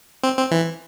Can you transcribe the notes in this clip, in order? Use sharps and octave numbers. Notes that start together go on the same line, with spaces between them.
C4
C4
E3